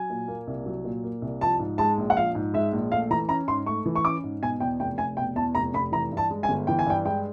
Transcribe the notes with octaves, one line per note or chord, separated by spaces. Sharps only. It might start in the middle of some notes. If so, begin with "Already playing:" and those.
Already playing: F#3 G#5
A#2
A#3
C2
F#3
A#2
A#3
C2
F3 A5
G#2
G#3 A5
A#1
F#5
F3 F5
G#2
G#3 E5
A#1
A3 F5
E3 A#5
C#4 A#5
G#2 C6
A3 C#6
E3
C#6
C#4 D6
G#2
B2 G#5
E2 G5
F1 G5
F1 G#5
B2 G5
E2 A5
F1 A#5
F1 B5
E3 A#5
G2
A5
G#3
G#5
G1
E3 G5
G#5
G2 G5
G#3 G5